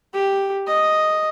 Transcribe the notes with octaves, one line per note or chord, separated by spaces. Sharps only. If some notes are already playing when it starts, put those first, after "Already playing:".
G4
D#5